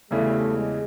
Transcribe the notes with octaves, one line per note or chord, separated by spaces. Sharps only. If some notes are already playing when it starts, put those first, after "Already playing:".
E2 C#3 E3 G3 A3
G#3